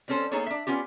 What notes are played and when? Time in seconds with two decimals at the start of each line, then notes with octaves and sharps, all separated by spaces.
0.08 G3 C4 C#4 A4 C5
0.31 A#3 B3 D#4 G#4 A4 C#5
0.46 D4 E5
0.67 B3 C#4 F4 G4